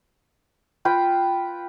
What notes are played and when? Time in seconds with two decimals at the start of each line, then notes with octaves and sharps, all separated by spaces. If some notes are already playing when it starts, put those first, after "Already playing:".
0.85 F4 B4 G5 C6